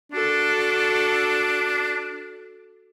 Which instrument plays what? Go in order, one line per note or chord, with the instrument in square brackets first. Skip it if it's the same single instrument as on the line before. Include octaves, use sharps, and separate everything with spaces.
[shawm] D4 [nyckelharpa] F#4 A4